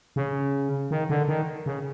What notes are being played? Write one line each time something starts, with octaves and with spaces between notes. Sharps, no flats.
C#3
D#3
D3
D#3
C#3